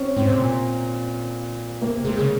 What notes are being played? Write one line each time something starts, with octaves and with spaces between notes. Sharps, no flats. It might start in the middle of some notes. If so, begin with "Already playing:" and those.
Already playing: C4 C#4
G#2 C4
C3
A#2
C3 A#3
C3 G#3
C#3